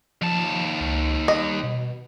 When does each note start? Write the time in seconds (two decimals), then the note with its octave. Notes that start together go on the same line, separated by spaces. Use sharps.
0.22 D#2 F3 A5
0.81 C#2
1.28 G3 D#5
1.63 B2